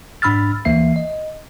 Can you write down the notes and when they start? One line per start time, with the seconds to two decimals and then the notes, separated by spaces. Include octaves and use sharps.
0.22 G#2 D4 B5 E6 F6 A6
0.65 D2 E3 A#3 E5 C7
0.96 D#5